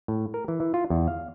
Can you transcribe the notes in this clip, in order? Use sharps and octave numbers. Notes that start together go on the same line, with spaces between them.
A2
A#4
E3
E3
F4
E2
F5